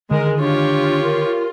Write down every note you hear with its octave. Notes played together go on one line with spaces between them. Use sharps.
D3 D#3 G#3 A#4
D4 F4 G4 C#5
A#4